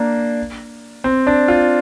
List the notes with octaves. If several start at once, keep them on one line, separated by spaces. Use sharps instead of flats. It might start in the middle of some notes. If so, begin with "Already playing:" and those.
Already playing: A#3 D4
C4
D4
F4